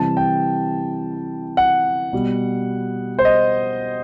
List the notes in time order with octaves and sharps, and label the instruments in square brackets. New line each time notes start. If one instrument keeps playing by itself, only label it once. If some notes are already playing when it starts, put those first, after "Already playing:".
Already playing: [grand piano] C3 E3 G3 A5
G5
F#5
B2 G3
C5
D#5